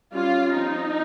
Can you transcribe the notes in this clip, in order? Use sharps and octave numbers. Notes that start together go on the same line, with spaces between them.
G3 C#4 F4
F3 C4 D#4